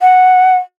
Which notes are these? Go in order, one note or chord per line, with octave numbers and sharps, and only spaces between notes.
F#5